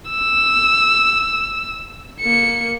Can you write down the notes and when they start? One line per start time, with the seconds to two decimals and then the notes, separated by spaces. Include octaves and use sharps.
0.10 E6
2.21 A#3 C#7